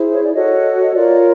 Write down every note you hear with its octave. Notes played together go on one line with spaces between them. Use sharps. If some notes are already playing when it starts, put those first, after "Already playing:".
Already playing: E4 G#4 C5
C#5
D5
F#4 A4 C#5 D#5
F4 A#4 C#5 D5